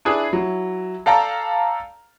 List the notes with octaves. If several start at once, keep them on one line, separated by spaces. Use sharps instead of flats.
D4 E4 G#4 B4
F#3 E4
A4 D5 F5 G5 A5 A#5